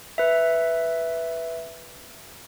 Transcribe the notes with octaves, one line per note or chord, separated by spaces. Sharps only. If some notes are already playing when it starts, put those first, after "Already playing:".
B4 E5